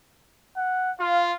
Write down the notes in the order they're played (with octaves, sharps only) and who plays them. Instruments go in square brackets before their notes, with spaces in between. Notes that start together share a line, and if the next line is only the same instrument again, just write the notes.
[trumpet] F#5
[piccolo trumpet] F4 [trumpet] F5